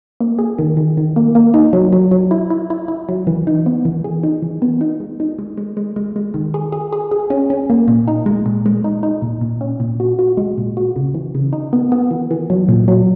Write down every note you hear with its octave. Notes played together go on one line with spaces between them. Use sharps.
A#3
G#4
D#3
D#3
D#3
A#3
A#3
D#4
F#3
F#3
F#3
E4
E4
E4
E4
F#3
E3
D#4
B3
E3
G#4
D#4
E3
B3
D#4
G#3
D#4
G#3
G#3
G#3
G#3
G#3
D#3
G#4
G#4
G#4
G#4
C#4
C#4
A#3
A#2
D#4
G#3
A#2
G#3
D#4
D#4
A#2
A#2
C#4
A#2
F#4
F#4
G#3
A#2
F#4
C#3
E3
C#3
D#4
B3
B3
E3
E3
F#3
A#2
F#3